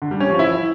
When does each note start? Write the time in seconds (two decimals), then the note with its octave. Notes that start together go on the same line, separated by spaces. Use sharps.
0.02 D3
0.11 G3
0.20 C#4
0.30 F3
0.39 E4